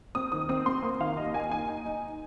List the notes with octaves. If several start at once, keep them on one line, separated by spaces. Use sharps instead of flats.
C4 D#6
D#3 D#6
C4 D#6
C4 C6
A#3
D#3 F5
D#2 D#5
A#3 G#5
D#4 G#5
D#4
D#4